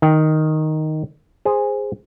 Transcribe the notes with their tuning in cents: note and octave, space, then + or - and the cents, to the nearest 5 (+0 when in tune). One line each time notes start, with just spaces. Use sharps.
D#3 +0 G5 +0
G#4 -10 C5 +0